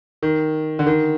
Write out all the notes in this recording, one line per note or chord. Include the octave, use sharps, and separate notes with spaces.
D#3
D3
D#3